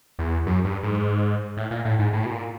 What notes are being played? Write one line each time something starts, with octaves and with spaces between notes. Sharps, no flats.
E2
F#2
G2
G#2
A2
A#2
A2
G#2
A2
B2
A#2